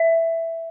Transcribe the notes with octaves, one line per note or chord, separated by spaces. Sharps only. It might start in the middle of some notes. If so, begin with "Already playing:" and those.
Already playing: E5